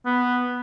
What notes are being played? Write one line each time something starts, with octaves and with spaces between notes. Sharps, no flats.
B3